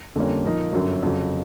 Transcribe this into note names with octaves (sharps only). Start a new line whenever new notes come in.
F2 D3 G3 A#3 C#4
A#2 F3 A#3 D#4
G1 F#2 D3 F#3
F2 C#3 F#3